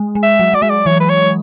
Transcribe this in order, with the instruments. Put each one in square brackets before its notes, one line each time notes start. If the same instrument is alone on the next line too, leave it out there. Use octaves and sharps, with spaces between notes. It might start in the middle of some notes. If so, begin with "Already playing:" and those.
Already playing: [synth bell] G#3
G#3
[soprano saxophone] E5
[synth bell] F#3
[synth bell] F#3 [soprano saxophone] D5
[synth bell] G#3 [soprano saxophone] E5
[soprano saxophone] D5
[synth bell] E3 [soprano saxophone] C#5
[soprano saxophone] B4
C#5